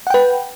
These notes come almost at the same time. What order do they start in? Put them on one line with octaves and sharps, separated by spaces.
F#5 G5 B4